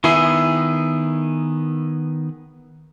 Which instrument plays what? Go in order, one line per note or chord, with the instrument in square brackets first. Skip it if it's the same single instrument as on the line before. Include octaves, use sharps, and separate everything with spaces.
[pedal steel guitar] D#3 B3 G#4 [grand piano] E4